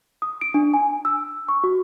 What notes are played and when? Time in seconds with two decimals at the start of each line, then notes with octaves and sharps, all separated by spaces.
0.22 D#6
0.41 D7
0.54 D4
0.74 G#5
1.05 E6
1.49 C#6
1.64 F#4